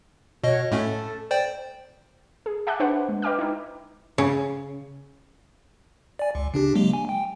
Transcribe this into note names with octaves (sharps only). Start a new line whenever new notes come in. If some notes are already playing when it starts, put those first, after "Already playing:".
B2 F#4 C#5 D#5
A2 A3 C#4 A4
C5 D5 G5
G#4
E5 F#5 G#5 A5 D6 F#6
D4 B4 C5 F#5
G#3
B4 D#5 G5 D6 F6
D#4 E4
C#3
D5 G#5
C#2
C#3 D4 G4
F#3 G#3 A#3
G#5
G5